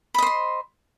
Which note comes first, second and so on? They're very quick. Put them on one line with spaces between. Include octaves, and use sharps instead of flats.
B5 D#5 C5 C6